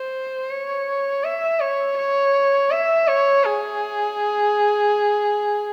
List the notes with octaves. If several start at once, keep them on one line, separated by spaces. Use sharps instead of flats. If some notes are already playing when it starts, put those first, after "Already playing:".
Already playing: C5
C#5
E5
C#5
C#5
E5
C#5
G#4